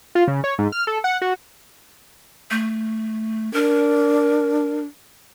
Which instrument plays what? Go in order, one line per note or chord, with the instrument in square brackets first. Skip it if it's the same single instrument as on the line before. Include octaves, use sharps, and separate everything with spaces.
[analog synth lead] F4
C#3
C#5
G#2
F6
A4
F#5
F#4
[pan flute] A3
[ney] D4 [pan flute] A#4